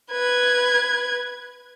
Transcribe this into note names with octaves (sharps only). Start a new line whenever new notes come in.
B4 G#6